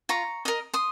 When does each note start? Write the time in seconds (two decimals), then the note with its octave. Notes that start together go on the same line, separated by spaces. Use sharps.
0.09 F4 A#5 C#6
0.45 A#4 D#5 D#6
0.74 C6 D#6